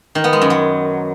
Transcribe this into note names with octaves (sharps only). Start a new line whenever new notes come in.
D#3
B3
G#3
F#2
F#3